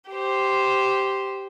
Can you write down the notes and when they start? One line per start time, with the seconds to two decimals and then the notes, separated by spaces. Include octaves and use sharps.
0.10 G4 C5